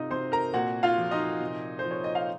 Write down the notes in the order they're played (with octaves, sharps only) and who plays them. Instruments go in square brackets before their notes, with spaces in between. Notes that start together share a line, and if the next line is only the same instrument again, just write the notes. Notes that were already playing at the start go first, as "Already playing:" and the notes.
Already playing: [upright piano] C3 D#4 F4 D#5
C3 C5 C6
A#4 A#5
A#2 F#4 F#5
F4 F5
F3
D#4 D#5
C3
C5
F3
C#5
D#5
F5